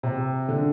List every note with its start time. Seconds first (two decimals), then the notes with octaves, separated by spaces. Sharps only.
0.03 C3
0.49 D3